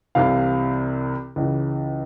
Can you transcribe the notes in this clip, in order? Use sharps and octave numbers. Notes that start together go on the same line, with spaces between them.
C2 C3 E3 F5
C#2 C#3 E3